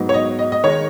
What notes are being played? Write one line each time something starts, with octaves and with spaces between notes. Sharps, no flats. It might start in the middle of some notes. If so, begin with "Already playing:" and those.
Already playing: G#2 F#3 B3 D#4
C#5
D#5
D#5
D#5
D#3 G#3 D#4 C#5